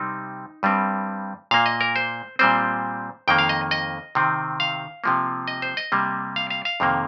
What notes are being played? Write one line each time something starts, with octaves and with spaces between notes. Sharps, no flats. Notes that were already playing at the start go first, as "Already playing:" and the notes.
Already playing: C3 G3 C4 D#4
G2 G3 C4
A#2 A#3 F5
D#5
A#4
C5
A#2 G3 C4 C5
F2 D#3 A#3 G5
F5
D#5
D#5
C3 D#3 C4
F5
C3 F3 A#3
D#5
C5
D#5
C3 G3 A#3
F5
F5
F5
F2 C3 D#3 A#3